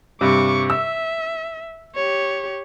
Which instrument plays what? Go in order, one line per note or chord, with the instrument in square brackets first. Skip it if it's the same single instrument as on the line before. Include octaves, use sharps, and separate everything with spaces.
[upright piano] G2 C3 [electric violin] C#6 D6
[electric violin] E5 [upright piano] E6
[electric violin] G4 C#5